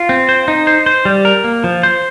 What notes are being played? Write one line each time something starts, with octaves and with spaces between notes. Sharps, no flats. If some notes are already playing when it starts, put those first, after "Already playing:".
Already playing: F4
C4
C5
D#4
C5
C5
G3
A#4
A#3
F3
C5